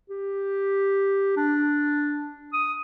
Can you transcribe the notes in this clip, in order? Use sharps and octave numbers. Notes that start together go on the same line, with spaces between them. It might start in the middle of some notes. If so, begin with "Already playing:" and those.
G4
D4
D#6